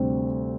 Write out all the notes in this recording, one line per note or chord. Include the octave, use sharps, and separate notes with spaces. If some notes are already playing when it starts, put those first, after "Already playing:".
Already playing: D2 C3 G3 C4